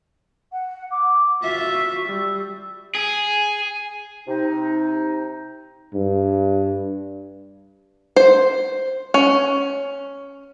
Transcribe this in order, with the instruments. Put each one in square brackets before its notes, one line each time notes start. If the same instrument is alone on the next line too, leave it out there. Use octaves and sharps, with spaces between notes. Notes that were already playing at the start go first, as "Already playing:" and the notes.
[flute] F#5
D6
[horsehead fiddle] F4 E5 [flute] F#4
[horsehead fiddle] G3 [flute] E6
[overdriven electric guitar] G#4
[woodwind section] C3 D#4
[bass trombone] G2
[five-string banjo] C5
C#4